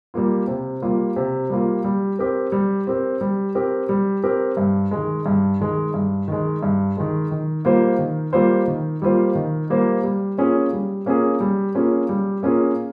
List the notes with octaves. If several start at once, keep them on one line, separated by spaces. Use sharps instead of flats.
G3 A#3 F4
C3
G3 A#3 F4
C3
G3 A#3 F4
G3
C4 G4 A#4
G3
C4 G4 A#4
G3
C4 G4 A#4
G3
C4 G4 A#4
G2
D#3 G#3
G2
D#3 G#3
G2
D#3 G#3
G2
D#3 G#3
D#3
G3 A#3 F4 C5
D#3
G3 A#3 F4 C5
D#3
G3 A#3 F4 C5
D#3
G3 A#3 F4 C5
G3
A#3 C#4 F4 G#4
G3
A#3 C#4 F4 G#4
G3
A#3 C#4 F4 G#4
G3
A#3 C#4 F4 G#4